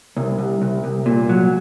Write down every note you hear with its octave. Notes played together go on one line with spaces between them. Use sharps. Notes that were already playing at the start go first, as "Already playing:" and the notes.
C2
C2
C2
C2
A#2
F#3